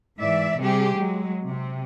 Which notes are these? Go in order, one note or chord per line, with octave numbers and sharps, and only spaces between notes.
G#2 E3 D5 E5
C3 G3 G4 G#4
F#3 G#3
C3